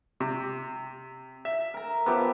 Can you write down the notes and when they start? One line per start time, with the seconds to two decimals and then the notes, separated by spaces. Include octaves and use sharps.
0.20 C3
1.45 E5
1.74 A#4 A#5
2.06 F3 B3 G4 E5